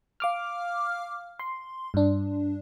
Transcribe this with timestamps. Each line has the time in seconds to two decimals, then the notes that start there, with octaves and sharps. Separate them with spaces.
0.20 F5 D6 F6
1.40 C6
1.94 G2 D4